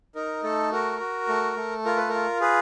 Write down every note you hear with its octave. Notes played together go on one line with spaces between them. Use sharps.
D#4 A#4
A3 A4
F#4 A#4
F#4
A3
A3
F4 A#4
B4
F4 A#4
G#4 B4